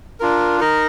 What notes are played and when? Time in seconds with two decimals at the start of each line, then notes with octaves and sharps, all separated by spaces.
0.20 D4 F4 A#4
0.60 D#4 A#4 D#5